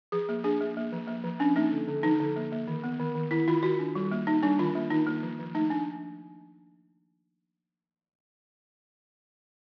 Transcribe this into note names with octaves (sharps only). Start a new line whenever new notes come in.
F3 G#4
A#3
D4 G#4
A#3
A#3
F3
A#3
F3
C#4 D4
A#3 D#4
D3
D3
F3 D#4
D3
A#3
A#3
D#3
B3
D#3
D#3
D#3 E4
D#3 F4
D#3 F#4
D4
G3
A#3
A#3 D#4
G3 D4
D#3 F4
A#3
D#3 D#4
A#3
F3
F3
A3 D#4
D4